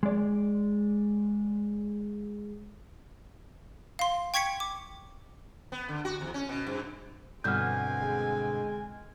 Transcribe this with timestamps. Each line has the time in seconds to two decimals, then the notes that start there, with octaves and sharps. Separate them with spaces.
0.03 G#3 D5
3.99 F5 C6
4.34 G5 C#6 G#6 B6 C#7
4.60 D6
5.72 B3
5.89 D3
6.05 F#4
6.21 E2
6.34 C#4
6.49 B2
6.67 G2
7.44 G2 B2 D3 C4 G#5 F6 G6
8.01 G#3